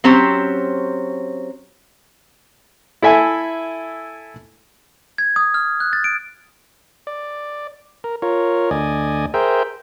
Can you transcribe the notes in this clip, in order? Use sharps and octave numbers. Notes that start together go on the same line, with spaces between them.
F#3 C4 C#4 G4 C5
E4 A4 E5 G#5
G#6
D#6
F6
F#6
A6
D7
D5
A#4
F4 A#4 C#5
D2 D5 D#5 G#5
G#4 A#4 C5 E5 G5